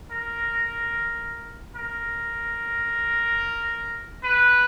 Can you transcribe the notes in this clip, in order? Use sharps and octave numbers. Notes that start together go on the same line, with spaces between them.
A#4
A#4
B4